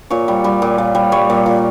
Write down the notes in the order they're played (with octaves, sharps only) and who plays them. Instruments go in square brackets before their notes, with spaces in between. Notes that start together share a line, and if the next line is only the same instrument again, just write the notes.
[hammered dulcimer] A#2 C#5
G3
G3
A#2
A#2
G3
G3 C#5
A#2
A#2